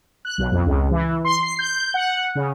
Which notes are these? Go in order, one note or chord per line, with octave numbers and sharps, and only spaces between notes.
F#6
B1
F2
C#2
E3
C6
C7
G6
F#5
C#3